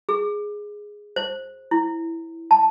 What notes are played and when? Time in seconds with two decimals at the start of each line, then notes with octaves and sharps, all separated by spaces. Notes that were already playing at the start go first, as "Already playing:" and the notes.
0.09 G#4
1.16 C5
1.71 E4
2.51 A5